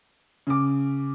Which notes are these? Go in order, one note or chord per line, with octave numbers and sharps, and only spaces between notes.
C#3 D6